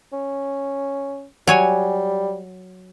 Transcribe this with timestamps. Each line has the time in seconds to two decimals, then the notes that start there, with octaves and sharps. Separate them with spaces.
0.13 C#4
1.47 F#3 G3 C#5 G#5